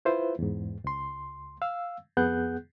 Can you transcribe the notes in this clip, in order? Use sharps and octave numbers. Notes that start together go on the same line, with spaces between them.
E4 F4 B4 C5 E5
E2 G#2
C#2 C6
F5 E6
F2 B3 G#4 F#5 F#6 G6